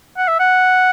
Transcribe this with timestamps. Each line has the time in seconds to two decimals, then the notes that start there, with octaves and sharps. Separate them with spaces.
0.17 F#5
0.28 E5
0.40 F#5